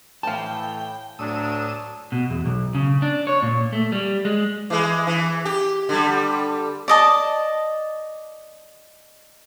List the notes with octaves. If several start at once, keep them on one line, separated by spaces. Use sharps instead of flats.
A2 E3 F5 G5 A5
D2 A2 F#3 D4 D#6 E6
B2
E2
B1
C#3
D4
C#5
A#2
A3
G3
G#3
E3 G#3
E3
G4
D3 G3
D5 D#5 A5